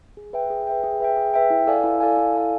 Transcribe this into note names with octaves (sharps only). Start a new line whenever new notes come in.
G#4
B4 E5 G5
G#4
B4 E5 G5
G#4
B4 E5 G5
G#4
B4 E5 G5
E4
A4 D5 F5 G#5
E4
A4 D5 F5 G#5
E4
A4 D5 F5 G#5